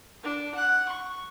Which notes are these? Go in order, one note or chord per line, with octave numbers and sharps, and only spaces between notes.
D4
F#5 F#6
C#6